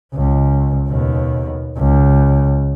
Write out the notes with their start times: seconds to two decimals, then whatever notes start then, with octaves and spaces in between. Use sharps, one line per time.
0.14 C#2
0.89 D#2 B2
1.78 C#2